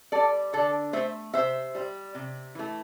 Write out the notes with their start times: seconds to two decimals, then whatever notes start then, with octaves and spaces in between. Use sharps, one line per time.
0.12 G3 A4 D5
0.53 D3 A4 D5
0.93 A3 C5 E5
1.34 C3 C5 E5
1.75 G3
2.15 C3
2.55 E3 A3